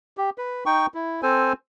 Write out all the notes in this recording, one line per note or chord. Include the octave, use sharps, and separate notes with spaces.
G4
B4
D#4 G5 C#6
E4
C4 A4 C5 G#5